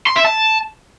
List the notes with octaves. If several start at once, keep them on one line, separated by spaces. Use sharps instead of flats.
C6
E5
A5